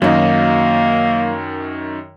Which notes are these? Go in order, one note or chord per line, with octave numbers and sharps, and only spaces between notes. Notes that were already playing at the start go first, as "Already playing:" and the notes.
F#2 D#3 F#3 A#3 D#4